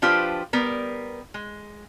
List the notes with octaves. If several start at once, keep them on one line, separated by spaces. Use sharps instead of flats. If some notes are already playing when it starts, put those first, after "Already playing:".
F3 D4 F4 G4 B4 C5
G3 B3 A#4
G#3